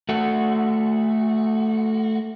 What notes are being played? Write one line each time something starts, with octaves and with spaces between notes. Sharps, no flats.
A3 F#4